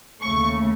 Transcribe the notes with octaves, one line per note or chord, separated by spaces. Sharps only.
D#2 C#3 A3 C#6